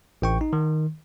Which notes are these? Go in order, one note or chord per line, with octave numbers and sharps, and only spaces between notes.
A1 G5 C#6
D#4
D#3